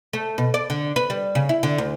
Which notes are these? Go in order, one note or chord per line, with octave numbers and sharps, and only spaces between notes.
A3
B2
D5
D3
B4
G3
C#3
E4
D3
D2